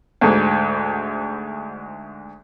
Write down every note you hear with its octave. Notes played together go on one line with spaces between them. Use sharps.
D2 G#2